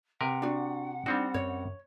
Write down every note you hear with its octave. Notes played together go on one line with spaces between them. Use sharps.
C3 A#4 B4 F#5
D4 F#4
G3 C4 D4 D#4 F#4
F#2 C#5